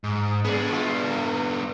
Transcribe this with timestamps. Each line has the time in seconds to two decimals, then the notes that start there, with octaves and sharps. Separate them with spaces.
0.04 G#2
0.44 B3 D4 G#4
0.68 G#3 F4
1.10 A3